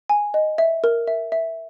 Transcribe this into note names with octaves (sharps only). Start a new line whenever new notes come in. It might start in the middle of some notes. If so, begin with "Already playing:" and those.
G#5
D#5
E5
A#4
E5
E5